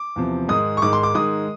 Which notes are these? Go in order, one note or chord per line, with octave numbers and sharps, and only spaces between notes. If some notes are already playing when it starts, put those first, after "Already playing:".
Already playing: D6
E2 C3 F3
G#2 D#3 G#3 D#6
C#6
G#2 D#3 G#3 D6
C6
D6
G#2 D#3 G#3 D#6